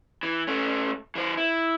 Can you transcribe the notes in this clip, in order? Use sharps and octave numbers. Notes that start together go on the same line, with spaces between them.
E3
A3 C#4
E3 C5
E4